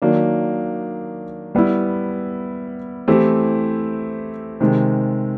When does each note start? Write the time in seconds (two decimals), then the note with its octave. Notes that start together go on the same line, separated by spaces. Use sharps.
0.02 D#3 F#3 A#3 D4
1.55 G3 B3 E4
3.08 E3 A3 C4 E4 G4
4.61 C3 D#3 G#3